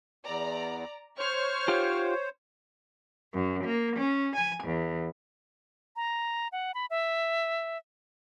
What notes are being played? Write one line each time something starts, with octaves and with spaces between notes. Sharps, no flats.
E2 D5 A#5
C5 C#5 C#6 F6
F4 G4
F#2
A#3
C#4
G#5
E2
A#5
F#5
B5
E5